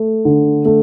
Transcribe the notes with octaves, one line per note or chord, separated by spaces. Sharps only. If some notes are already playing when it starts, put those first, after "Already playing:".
Already playing: A3
D3
A3